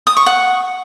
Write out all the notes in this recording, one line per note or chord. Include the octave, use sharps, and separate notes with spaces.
D#6
C#6
F#5